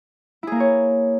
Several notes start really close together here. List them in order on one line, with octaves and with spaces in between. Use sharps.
E4 G#4 A#3 A#4 C#5